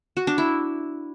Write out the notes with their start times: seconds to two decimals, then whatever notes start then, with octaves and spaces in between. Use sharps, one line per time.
0.17 F#4
0.27 D4
0.38 E4